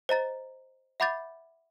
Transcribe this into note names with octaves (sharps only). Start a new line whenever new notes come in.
C5 D#5 A#5 A6
E5 F#5 B5 D6 G6 A6